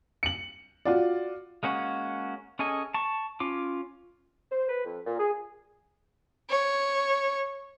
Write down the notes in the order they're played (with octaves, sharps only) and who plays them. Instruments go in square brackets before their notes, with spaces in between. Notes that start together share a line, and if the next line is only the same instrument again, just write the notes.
[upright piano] C#7 F#7
F4 F#4 D5
[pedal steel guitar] G#3 A#3 C#4 F#4
C#4 G#4 A4 D#5 G#5
A5 C#6
C#4 F4 D6
[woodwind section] C5
B4
F2
A#2
G#4
[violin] C#5